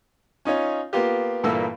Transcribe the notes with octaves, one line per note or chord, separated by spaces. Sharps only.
C#4 D#4 F4 C#5
A#3 B3 F4 G4
G2 A#2 E3 A#3 A4 E6